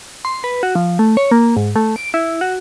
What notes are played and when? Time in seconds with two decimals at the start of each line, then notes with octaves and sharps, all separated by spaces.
0.25 C6
0.44 B4
0.63 F#4
0.75 F3
0.99 A3
1.17 C#5
1.31 A#3
1.56 G#2
1.76 A3
1.96 D7
2.14 E4
2.41 F#4